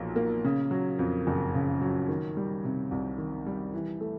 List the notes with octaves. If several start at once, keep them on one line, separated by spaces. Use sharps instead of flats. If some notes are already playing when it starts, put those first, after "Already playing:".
Already playing: B1 A#2 F3
A#3
C#3
F#3
F2
F#1
C#3
F#3
D#3
G3
C3
C2
D#3
G3
E3
A3